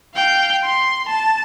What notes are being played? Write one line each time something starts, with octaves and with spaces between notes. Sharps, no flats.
F5 G5
C6
A5